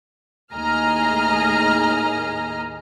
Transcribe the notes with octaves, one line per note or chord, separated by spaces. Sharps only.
D#2 A2 G#4 D#5 A#5 F6